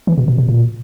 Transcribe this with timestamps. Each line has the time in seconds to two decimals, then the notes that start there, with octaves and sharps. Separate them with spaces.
0.07 E3
0.18 B2
0.28 B2
0.38 B2
0.48 A#2